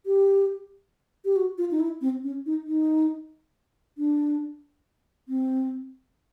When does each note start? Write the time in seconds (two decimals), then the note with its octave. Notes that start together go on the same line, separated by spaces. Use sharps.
0.06 G4
1.25 G4
1.36 F#4
1.58 F4
1.71 D#4
1.80 E4
2.01 C4
2.24 C#4
2.46 D#4
2.67 D#4
3.98 D4
5.28 C4